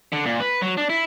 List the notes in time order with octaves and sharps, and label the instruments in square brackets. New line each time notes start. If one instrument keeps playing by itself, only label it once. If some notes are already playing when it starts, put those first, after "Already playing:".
[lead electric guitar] D3
A#2
B4
F#3
D4
E4